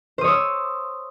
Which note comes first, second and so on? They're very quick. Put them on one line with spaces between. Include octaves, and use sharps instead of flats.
C5 D#6 C#5 E6